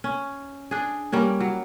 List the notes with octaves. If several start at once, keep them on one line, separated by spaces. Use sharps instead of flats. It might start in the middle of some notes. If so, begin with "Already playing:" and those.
C#4
D4 G#4
G3 A#3 C#4
F#3